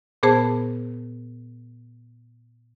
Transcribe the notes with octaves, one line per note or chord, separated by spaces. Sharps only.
A#2 B3 G#4 C5 A5